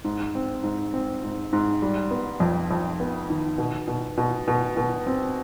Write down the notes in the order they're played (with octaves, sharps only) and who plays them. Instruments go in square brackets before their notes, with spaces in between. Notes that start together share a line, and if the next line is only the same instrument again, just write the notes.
[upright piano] G#2
C4
G#2
C4
G#2
G#2
G3
B3
F2
F2
B3
D#3
B2
B2
B2
B2
B2
C4